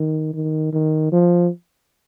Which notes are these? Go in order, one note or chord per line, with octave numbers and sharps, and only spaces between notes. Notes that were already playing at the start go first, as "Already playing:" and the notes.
Already playing: D#3
D#3
D#3
F3